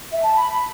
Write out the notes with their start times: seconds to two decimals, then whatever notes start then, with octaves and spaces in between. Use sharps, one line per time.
0.11 E5
0.22 A5
0.32 B5